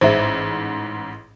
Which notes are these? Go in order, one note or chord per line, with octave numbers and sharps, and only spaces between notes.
A1 G#2 C5 E5